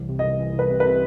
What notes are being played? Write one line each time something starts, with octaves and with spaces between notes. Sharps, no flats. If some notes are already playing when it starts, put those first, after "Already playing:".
Already playing: C2 E3
C3
D#5
C2
E3
C2 B4
C3
B4
C3